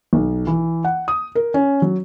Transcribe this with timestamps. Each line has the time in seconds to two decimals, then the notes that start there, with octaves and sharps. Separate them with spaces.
0.13 B1
0.47 E3
0.84 F#5
1.08 D#6
1.35 A#4
1.54 C#4
1.82 F#3